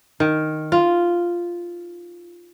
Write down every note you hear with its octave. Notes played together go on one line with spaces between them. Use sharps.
D#3
F4